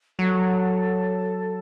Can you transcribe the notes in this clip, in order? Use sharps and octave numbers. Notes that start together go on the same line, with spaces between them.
F#3 A4